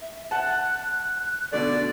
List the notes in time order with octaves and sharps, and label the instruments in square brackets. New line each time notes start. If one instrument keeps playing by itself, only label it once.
[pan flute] E5
[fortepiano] F#5 A5 [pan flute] F#6
[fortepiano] B2 D3 A3 [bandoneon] D5